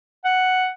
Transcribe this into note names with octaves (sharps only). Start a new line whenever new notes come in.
F#5